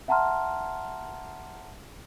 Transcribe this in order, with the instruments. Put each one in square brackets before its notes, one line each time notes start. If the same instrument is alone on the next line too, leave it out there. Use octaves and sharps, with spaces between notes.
[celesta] E5 F#5 A5 A#5 C6 F6